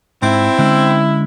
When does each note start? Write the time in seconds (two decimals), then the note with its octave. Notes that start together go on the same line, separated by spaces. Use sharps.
0.22 G#2 C4 E4
0.58 D3 G#3 C#4